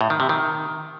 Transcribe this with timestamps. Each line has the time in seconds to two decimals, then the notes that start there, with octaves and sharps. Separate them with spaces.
0.01 A2
0.10 D#3
0.20 C3
0.29 D#3